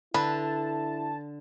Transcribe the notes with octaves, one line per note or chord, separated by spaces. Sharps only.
D3 E4 B4 A5